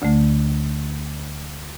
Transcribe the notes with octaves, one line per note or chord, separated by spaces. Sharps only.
D2 D3 A3